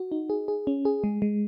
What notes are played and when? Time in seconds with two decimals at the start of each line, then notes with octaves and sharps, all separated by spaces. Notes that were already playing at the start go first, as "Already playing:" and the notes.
Already playing: F#4
0.12 D#4
0.30 G#4
0.48 G#4
0.67 C#4
0.85 G#4
1.04 G#3
1.22 G#3